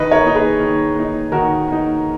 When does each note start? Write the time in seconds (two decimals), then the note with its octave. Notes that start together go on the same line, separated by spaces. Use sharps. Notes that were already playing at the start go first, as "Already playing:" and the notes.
Already playing: D#3 B4 D#5
0.11 A#4 C#5
0.23 A#3 D#4
0.35 G#4 B4
0.60 D#3
0.96 A#3 D#4
1.32 D#3 F#4 A#4
1.68 A#3 D#4